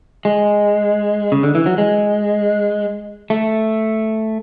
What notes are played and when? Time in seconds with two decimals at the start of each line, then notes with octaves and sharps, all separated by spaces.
0.25 G#3
1.32 C#3
1.43 D3
1.55 E3
1.66 F#3
1.78 G#3
3.30 A3